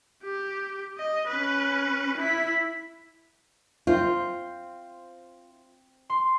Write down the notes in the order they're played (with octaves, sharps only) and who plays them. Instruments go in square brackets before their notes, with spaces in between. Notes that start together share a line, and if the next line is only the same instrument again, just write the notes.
[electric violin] G4
D#5
C#4 B4
E4 B6
[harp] C4 C5 [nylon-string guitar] F4
[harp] C6